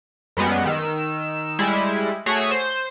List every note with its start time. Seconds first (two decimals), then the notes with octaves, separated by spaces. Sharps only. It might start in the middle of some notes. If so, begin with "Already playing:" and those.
0.37 F#2 G3 G#3 B3
0.66 D#3 E6
1.59 G3 G#3 E4
2.26 A3 F#4 G#4 C#5
2.51 C5